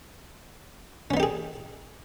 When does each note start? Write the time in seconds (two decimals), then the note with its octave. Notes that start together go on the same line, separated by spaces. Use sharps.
1.11 C#4
1.14 B3
1.17 D#4
1.20 G4
1.23 G#4